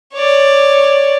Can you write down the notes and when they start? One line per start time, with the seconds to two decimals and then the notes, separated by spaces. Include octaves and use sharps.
0.13 C#5 D5